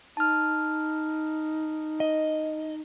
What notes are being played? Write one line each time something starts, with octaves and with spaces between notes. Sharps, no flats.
D#4 A5 F6
D#5